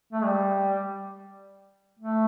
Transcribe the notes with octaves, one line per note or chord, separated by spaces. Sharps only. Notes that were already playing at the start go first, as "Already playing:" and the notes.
A3
G3
A3